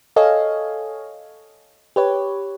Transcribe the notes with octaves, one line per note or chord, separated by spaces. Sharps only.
A4 C#5 D#5 F5 G#5
G4 B4 C#5